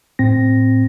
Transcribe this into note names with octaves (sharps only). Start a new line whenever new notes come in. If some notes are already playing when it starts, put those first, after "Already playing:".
A2 C4 A#6